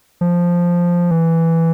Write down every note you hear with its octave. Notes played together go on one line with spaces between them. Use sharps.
F3
E3